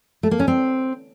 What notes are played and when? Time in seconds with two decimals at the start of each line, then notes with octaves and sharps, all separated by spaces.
0.23 A3
0.31 A#3
0.40 C#4
0.48 C4